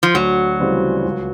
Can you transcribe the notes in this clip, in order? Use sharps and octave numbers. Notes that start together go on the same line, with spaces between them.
F3
D2 F#3
C#3 E3 G3 C4
C#2